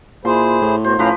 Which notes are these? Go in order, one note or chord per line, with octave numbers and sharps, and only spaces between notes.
A#2 E4 G#4 C5 C6
A2
B3 F#4 C5
A2 F3 C#4 B4 F5 A#5 D6